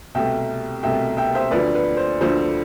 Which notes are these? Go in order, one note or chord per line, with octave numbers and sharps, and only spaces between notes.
C2 B2 A3 E5 G5
C2 B2 A3 E5 G5
E5 G5
C5 E5
D2 D3 F3 B4 D5
B4
C5
D2 D3 F3 C5